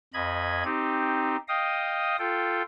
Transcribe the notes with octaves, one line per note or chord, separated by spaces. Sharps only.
F2 D#5 B5 G#6
C4 D#4 G4
D#5 F5 G5 D#6
F4 A4 G5